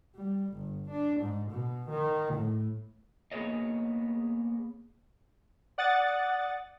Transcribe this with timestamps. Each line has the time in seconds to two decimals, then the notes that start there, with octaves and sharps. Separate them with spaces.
0.15 G3
0.54 G1
0.89 D4
1.21 G#2
1.51 B2
1.90 D#3
2.34 A2
3.32 A#3 B3 G#4 B4 C#5 D#5
5.78 D5 F#5 D#6 A6